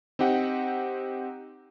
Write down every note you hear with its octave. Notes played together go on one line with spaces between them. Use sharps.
C4 D#4 G4 F#5